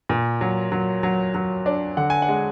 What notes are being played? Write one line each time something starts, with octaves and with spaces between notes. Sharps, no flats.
A#2
F#3
F#3
F#3
F#3
D4
D3 F#5
G#5
F#5
G#3